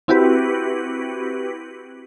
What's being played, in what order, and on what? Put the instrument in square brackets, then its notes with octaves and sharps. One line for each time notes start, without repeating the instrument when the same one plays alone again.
[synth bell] C4 E4 F#4 G4 B4